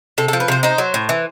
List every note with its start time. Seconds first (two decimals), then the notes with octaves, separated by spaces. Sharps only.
0.18 C3 A4
0.28 A4
0.33 F3
0.40 B4
0.48 C3 C5
0.63 D#4 C5
0.78 F#3
0.94 A2
1.09 E3